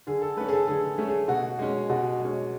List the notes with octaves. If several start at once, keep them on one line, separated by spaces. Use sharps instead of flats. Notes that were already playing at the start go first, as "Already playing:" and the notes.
D3 G#4
A4
A3 C#4 B4
G#4
A4
D3 G#4
A3 C#4
G#4
B2 F#4
G#3 C#4
B2 F#4
G#3
C#4